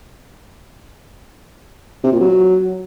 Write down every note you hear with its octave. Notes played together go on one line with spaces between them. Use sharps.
C3
A#2
F#3